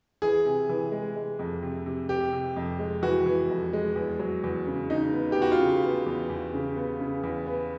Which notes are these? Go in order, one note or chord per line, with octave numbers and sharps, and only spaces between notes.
E3 G#4
C3
E3
G#3
G#3
F2
C3
C3
C3 G4
C3
F2
G#3
E3 F#4
E3
F2
G#3
E2
F#3
E2
C#3
C#3 D#4
B3
B3 G4
F#4
F4
C#3
B3
E2
E2
C#3
B3
C#3
E2
B3